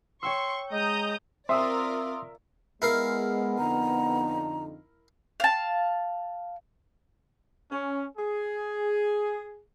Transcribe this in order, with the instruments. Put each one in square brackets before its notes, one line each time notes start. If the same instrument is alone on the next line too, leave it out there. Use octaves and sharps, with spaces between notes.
[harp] C#5 G5 E6 [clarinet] C6 [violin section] C#6
[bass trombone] G#3 [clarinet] D#5 [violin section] A#5 D#6 G6
[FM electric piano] C4 [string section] F4 A#4 D5 [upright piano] E5 [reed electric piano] C6 D#6 E6
[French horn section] G#3 [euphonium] B3 [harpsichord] E4 A#4 F5
[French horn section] F2 D3 D#4 [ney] A#5
[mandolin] F5 A5
[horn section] C#4
G#4